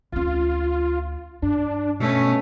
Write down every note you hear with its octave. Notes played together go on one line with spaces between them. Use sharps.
D2 C#4 F4
G2 D4
B2 A3 C#4